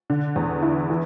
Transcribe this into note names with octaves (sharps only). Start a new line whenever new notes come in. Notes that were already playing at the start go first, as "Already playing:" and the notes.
D3
E2
E4
E3